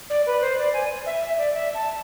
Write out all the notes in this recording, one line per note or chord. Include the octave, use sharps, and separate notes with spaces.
D5
B4
C5
D5
G#5
E5
E5
D5
E5
A5